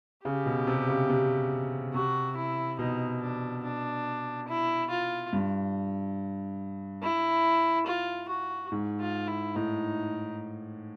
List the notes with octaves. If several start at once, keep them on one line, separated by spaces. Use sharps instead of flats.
C#3 G4
B2
C3
C#3
C3
C3 F#4
E4
B2 D#4
D4
D4
E4
F4
G2
E4
F4
F#4
G#2
F4
E4
A2 D#4